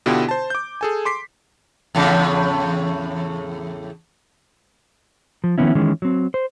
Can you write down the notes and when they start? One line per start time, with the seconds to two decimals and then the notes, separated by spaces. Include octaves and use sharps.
0.06 B2 D3 B3 E4 F4 G4
0.29 C5 A5
0.50 D6 G6
0.81 G#4 A4 G#5
1.05 C6 D6 B6 C7
1.95 E2 A2 C#3
5.44 F3
5.58 D#3 F3 B3 C#4 E4
5.75 D#3 E3 G#3 C#4
6.02 F#3 C4
6.34 C5